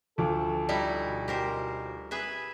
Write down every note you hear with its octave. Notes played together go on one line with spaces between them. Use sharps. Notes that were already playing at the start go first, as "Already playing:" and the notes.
D2 F3 A4 D6
G3 D#4 E4
B2
G4 A#4 C5
G#4 B4 E5